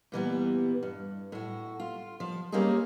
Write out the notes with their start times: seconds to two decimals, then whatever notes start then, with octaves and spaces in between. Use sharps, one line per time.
0.12 A#2 E3 G3 B3
0.83 G2
1.32 A2 F#4
1.80 F4
2.20 F3
2.52 G3 A#3 C4 C#4 D#4 G#4